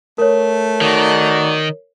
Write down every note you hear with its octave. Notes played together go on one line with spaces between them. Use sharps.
A3 A#4 C#5
D#3 D#4 F#4 D5